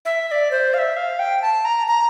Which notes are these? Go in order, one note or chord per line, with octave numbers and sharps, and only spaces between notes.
E5
E5
D5
C5
F5
E5
F5
G5
A5
A#5
A#5